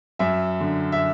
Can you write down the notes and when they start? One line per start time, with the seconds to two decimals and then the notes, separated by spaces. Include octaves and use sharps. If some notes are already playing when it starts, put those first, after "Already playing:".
0.19 F#2 E5
0.61 D3
0.92 E5